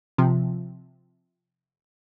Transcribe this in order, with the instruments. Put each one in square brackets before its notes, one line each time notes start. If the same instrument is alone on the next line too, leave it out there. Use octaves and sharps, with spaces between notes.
[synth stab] C3 F3